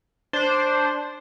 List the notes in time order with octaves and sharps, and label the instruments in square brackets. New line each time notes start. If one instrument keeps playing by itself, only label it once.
[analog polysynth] D4 C5